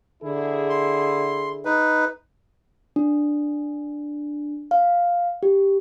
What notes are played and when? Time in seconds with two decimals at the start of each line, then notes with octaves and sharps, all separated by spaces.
0.22 D3 E4 G#4
0.69 C6
1.65 D#4 B4
2.96 D4
4.71 F5
5.43 G4